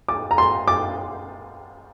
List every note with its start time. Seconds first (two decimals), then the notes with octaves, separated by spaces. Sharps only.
0.09 D6
0.31 A#5
0.38 C6
0.68 D6